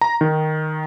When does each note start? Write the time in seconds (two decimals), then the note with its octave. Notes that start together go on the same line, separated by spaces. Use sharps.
0.01 A#5
0.21 D#3